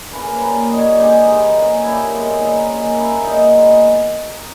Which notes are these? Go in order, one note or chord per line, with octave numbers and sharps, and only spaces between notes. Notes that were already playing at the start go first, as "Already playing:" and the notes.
Already playing: C#5
C#3 E3 A#3 C#4 B4
A#4
B4
A#2 G3 A#3 C#4
A#2 G3 A#3 C#4 D#5
C#5
C#5
G2 E3 G#3 C#4 G4
G2 E3 G#3 C#4 D#4
A#2 A#3 C#4
A#2 A#3 C#4 E4
G4
A#2 G#3 B3
A#2 G#3 B3 D#4
C#3 G3 A#3 C#4
C#3 G3 A#3 C#4 E4
A#2 G#3 B3 D#4
A#2 G#3 B3